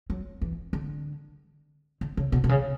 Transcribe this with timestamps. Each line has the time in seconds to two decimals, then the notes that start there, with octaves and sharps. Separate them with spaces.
0.10 F#3
0.42 E3
0.73 D3
2.01 D3
2.17 C#3
2.32 B2
2.44 B2
2.49 C#3